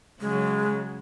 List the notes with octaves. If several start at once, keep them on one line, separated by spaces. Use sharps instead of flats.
C#3 F#3 G#3